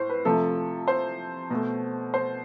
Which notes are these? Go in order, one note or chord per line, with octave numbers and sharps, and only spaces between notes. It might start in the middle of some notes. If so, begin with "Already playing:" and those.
Already playing: A2 C5
B4
C3 F3 A3 A4
C5
B2 A3
C5